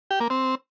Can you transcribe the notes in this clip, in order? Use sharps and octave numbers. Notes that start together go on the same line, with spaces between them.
G4
A#3
C4